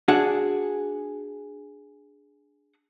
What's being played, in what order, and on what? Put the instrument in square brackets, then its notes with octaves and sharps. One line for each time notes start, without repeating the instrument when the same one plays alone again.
[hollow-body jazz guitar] D4 F#4 G#4 F#5